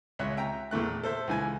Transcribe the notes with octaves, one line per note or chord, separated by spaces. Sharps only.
C#2 C#5 E5 F#6
E5 G5 A#5
E2 A#2 A3 F#6
A4 C5 E5
C#2 E3 G#5